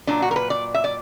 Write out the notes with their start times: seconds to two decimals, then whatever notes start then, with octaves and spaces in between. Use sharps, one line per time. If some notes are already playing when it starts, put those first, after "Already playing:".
0.07 A#2 F#3 D4
0.22 F#4
0.31 A#4
0.36 B4
0.50 D5
0.74 E5
0.84 D5